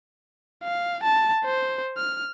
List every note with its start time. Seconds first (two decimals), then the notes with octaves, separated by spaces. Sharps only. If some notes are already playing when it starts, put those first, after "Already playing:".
0.64 F5
1.04 A5
1.45 C5
1.98 F6